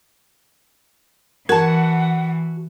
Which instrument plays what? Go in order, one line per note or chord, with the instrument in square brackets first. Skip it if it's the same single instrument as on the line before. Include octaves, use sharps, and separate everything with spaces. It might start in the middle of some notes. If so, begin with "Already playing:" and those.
[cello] E3 [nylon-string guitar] F#4 A5 [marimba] A#4 [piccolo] F#5